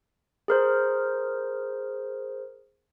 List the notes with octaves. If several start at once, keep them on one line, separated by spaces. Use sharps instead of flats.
G#4 A#4 C5